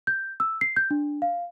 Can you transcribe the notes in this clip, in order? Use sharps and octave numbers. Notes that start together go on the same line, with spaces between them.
G6
E6
C7
G6
D4
F5